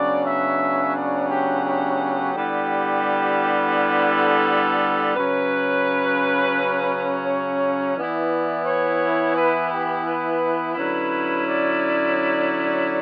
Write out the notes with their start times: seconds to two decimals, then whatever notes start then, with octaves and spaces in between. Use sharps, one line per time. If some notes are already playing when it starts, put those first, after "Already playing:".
Already playing: C#3 F#3 B3 D4 D5
0.24 E5
0.94 D5
1.29 G4
1.64 G4
2.34 D3 G3 B3 E4
3.74 G4
4.09 A4
5.14 C#3 F#3 C#4 B4
7.25 C#5
7.95 E3 B3 E4 D5
8.64 C#5
9.35 B4
9.70 G4
10.05 B4
10.74 D3 F#3 C#4 E4 B4
11.46 D5